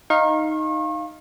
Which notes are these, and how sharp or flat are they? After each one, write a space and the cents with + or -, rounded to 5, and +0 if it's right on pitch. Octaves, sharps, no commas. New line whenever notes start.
D#4 +0 F5 +0 C#6 -40